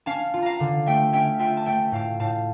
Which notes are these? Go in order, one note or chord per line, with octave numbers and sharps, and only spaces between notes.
C#4 F5 A5
F4
F5 A5 A#5
D3
A3 E5 G5
C#4 E5 G5
F4 E5 G5
A5
A3 E5 G5
A2 F5 A5
A2 F5 A5